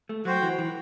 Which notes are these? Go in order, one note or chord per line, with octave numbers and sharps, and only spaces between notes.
A3
F#3 F#4 C5 G5
E3
E3